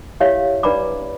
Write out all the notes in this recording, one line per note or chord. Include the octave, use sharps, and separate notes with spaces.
E4 G4 C#5 E5 F5
D4 B4 D5 A#5 B5 D6